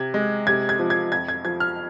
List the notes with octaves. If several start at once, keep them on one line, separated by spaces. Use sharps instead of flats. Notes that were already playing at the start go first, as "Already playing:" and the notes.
Already playing: C3 G#6
G#3
C3 G#6
G#6
F3
G#6
F2 G#6
G#6
F3 G#6
F6